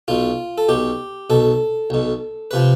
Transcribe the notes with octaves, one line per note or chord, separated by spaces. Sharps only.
B1 B2 F4
A4
B1 B2 G4
B1 B2 A4
B1 B2
C3 F3 B4